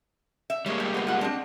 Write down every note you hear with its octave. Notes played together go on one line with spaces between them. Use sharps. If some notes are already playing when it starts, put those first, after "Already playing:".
E5
G3 G#3 A#3 C#5 E5
G4
B3 C5
F4 F#5
C4 D4